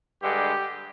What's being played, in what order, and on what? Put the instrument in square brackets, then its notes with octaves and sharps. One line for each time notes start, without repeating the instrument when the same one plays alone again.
[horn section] G2 D3 G#3 G4